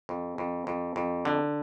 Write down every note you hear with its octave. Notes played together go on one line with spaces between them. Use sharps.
F2
F2
F2
F2
D3